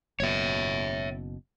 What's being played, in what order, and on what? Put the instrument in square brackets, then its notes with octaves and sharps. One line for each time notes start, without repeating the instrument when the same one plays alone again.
[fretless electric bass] F#1 B2 [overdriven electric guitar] C#5 E5